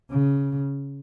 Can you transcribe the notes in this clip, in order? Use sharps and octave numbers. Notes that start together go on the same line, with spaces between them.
C#3